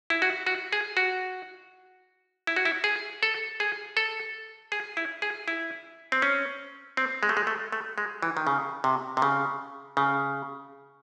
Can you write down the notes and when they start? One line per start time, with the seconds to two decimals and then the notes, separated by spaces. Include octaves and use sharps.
0.10 E4
0.22 F#4
0.47 F#4
0.73 G#4
0.97 F#4
2.47 E4
2.56 F#4
2.65 E4
2.84 G#4
3.23 A4
3.60 G#4
3.97 A4
4.72 G#4
4.97 E4
5.22 G#4
5.48 E4
6.12 C4
6.22 C#4
6.97 C4
7.23 G#3
7.29 A3
7.37 G#3
7.47 A3
7.72 A3
7.98 G#3
8.22 E3
8.37 D#3
8.47 C#3
8.84 C3
9.17 C3
9.22 C#3
9.97 C#3